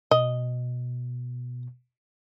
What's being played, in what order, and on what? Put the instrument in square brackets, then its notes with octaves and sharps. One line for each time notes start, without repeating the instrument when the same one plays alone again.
[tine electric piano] B2 [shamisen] D#5